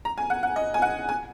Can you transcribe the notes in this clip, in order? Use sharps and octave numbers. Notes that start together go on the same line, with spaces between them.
A#5
G#5
F#5
F#5
D#5
G#5
F#5
G#5